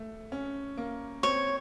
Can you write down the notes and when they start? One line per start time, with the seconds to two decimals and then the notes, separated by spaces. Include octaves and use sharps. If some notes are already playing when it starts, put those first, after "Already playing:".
Already playing: A3
0.32 C#4
0.78 A#3
1.23 C4 C#5